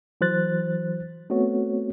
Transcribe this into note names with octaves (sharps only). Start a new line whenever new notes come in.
E3 F#3 C5 F#6 A6
A3 B3 C4 F#4 C#5